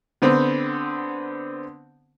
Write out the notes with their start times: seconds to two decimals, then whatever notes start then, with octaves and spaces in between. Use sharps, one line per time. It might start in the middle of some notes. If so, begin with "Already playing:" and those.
0.22 D3 B3 C4